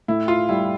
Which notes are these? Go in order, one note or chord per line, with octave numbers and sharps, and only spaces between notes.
A2 E4
F4
G3 E4